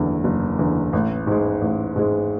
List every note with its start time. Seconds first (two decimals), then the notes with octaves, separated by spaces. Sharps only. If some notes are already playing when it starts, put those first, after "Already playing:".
Already playing: F#1 E2 D3
0.24 F#1
0.59 E2 D3
0.93 A1
1.27 G#2 G#3
1.61 A1
1.96 G#2 G#3